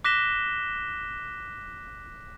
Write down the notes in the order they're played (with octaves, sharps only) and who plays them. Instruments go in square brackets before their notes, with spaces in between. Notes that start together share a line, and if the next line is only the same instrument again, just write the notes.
[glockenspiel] D6 F#6 A#6 B6 E7 G7